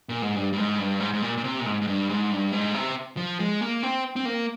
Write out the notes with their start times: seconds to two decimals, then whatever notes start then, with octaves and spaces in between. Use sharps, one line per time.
0.09 A#2
0.22 G#2
0.36 G2
0.53 G2
0.57 G#2
0.78 G2
1.00 G#2
1.13 G#2
1.22 A#2
1.37 A#2
1.44 C3
1.60 A#2
1.66 G#2
1.82 G#2
1.87 G2
2.09 G#2
2.31 G2
2.52 G#2
2.74 C3
3.17 F3
3.39 G#3
3.61 A#3
3.83 C4
4.16 C4
4.25 A#3